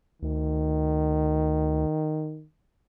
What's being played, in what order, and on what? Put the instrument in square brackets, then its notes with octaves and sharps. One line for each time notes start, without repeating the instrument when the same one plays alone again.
[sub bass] D2 [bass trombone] D#3